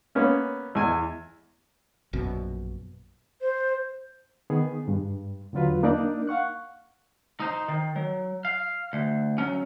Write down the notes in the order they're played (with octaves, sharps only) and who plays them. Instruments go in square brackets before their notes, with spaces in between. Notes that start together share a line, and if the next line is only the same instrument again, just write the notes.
[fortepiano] A#3 B3 C#4
E2 G#5
[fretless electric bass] A#1 F#2 B2
[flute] C5
[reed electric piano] D#3 B3 G#4
G2
E2 D3 F#3 F4 B4
A#3 D4 D#4 A#4 D5
F5 F#5 C#6 F#6
[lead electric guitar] D#4 C5
D#3
F#3
F5
D2
F#3 C#4